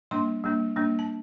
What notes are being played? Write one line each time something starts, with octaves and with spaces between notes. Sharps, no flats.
G3 A#3 D4 C6
G3 A#3 D4
G3 A#3 D4
A5